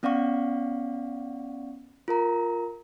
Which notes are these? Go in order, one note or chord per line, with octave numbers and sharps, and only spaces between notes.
B3 C#4 D5 F5 F#5 C#6
F4 A#4 A#5